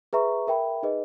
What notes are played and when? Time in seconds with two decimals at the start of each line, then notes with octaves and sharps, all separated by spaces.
0.13 G#4 B4 E5 A#5 C#6
0.47 A#4 E5 G5 B5
0.83 D#4 G#4 B4 D#5